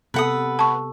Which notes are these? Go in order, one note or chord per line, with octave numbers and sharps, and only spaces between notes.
C3 B3 A4 B4 F#5 D#6
A5 C#6